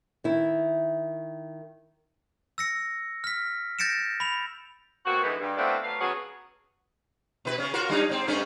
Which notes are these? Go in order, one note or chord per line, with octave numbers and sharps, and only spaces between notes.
D#3 E4
E6 A#6 C#7
F6 B6
G6 A6 A#6 C#7 D7 E7
B5 F7
B2 A#3 C4 F#4
D3 E3 G#3 B3 D#4
G2
A3 B3 C4 D4 E4 F4
F#3 A3 B3 F5
C#3 F#3 B3 F#4 G#4 C#5
B2 B4
C#3 C#4
F4 F#4 A#4
G3 D4 D#4
G#2 C4
G2 A3 C#4